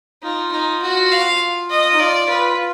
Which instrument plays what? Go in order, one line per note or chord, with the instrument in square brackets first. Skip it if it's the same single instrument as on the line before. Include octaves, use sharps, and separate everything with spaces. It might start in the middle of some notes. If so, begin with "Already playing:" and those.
[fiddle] D#4 [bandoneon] F4
[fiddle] D#4
F#4
F5
D#5
[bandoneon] D#4
[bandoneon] F4 [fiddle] D5
[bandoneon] F4 [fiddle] B4
[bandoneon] F4